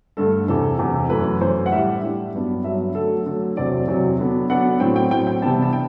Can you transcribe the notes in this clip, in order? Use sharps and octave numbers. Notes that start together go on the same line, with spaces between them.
G2 D3 A3 A4
E2 C3 E3 A4
E2 C3 E3
F#2 E3 A3 B4
F#2 E3 A3 C5
F#5
A2 G3 D4 E5
A2 G3 D4
G2 F#3 B3 D4
G2 F#3 B3 D4 E5
D3 F#3 A3 A4
D3 F#3 A3
E2 C3 F#3 C4 D5
E2 C3 F#3 C4
D3 F#3 B3 D4
D3 F#3 B3 D4 F#5
A2 F#3 C4 G5
G5
A2 F#3 C4 G5
G5
C3 E3 G3 B3 D4 A5
A5
G5